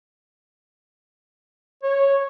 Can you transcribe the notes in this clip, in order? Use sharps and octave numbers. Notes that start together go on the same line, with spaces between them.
C#5